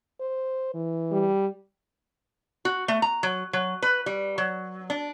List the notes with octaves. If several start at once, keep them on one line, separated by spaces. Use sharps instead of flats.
C5
E3
G3
F#4
A3
A#5
F#3
F#3
B4
G3
F#3
D4